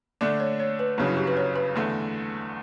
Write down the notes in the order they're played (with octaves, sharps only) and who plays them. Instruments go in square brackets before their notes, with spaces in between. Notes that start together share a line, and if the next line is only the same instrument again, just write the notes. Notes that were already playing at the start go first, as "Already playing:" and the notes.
[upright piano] D3 A3 D4 [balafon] D5
[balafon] C#5
C#5
B4
[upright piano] G1 F#2 C#3 F#3 C#4 [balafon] D4
[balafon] E4
G4
B4
C#5
B4
[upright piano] E2 D3 A3